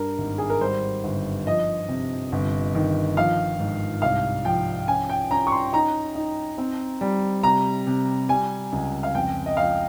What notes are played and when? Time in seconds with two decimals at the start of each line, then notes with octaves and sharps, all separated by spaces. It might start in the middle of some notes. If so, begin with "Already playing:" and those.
Already playing: G2 A#4
0.18 G#1
0.38 G#4
0.50 A#4
0.61 G3 C5
1.04 G1
1.47 F3 D#5
1.88 C3
2.32 G1
2.75 D#3
3.17 F3 F5
3.59 G#2
4.02 C2 F5
4.45 F3 G5
4.88 C#4 G#5
5.10 G5
5.31 C#4 A#5
5.47 C#6
5.52 C6
5.73 D#4 A#5
6.15 D#4
6.58 C4
7.01 G3
7.43 C3 A#5
7.87 C3
8.29 G3 G#5
8.72 C#2
9.03 F5
9.14 F2 G5
9.46 D#5
9.57 F3 F5